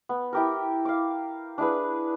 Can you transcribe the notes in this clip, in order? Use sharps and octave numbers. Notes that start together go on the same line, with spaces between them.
B3
E4 G4 A#4
F5 D6
D4 E4 G#4 B4